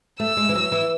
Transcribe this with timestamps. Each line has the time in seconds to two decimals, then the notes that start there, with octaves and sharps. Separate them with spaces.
0.20 A3 E6
0.37 G#3
0.49 E3
0.55 F#3
0.72 E3